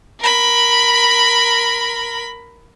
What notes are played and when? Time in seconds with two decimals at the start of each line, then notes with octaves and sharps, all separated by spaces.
0.20 A#4 B5